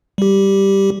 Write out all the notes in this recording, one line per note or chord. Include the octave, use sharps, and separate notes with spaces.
G3 G4